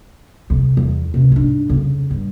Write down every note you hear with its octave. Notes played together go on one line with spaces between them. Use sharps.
F2 C3
E2
C#2 C3
G#2 D4
F2 C#3
G2